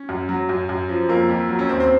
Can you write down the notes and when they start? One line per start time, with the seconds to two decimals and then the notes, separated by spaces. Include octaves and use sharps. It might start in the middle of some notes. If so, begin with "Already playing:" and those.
Already playing: C#4
0.09 F#2
0.29 F#3
0.49 F#2
0.69 F#2
0.89 F3
1.09 F2 A#3
1.29 F2
1.49 F#3
1.59 C#4
1.69 D#2 C4
1.80 C4